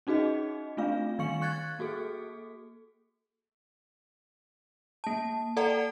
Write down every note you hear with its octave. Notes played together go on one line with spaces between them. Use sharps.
C#4 D#4 F#4 G#4 D#5
A3 C4 D4 F4 F5
D#3 G3 F5 C#6 C#7 F#7
C#6 F#6 G#6 A6
A#3 F#4 G#4 A4
A#3 A5
A4 D5 F#5 A#5